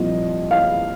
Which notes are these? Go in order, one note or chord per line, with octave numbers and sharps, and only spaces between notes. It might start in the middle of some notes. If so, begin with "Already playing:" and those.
Already playing: C2 A#2 F3 D#5
F5